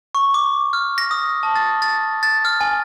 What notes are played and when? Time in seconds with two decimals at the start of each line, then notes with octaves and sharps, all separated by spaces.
0.15 C#6
0.34 D6
0.73 F6
0.98 A#6
1.11 D#6
1.43 A5
1.56 A6
1.82 A6
2.23 A6
2.45 F6
2.61 G#5